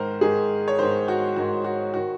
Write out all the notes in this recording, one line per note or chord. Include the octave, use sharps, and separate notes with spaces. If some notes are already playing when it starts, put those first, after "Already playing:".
Already playing: G#2 D#3 A#4 C5
G#2 D#3 G#4
C#5
G#2 D#3 C5
F#4
G#2 D#3 F#4
F#4
D#3 F#4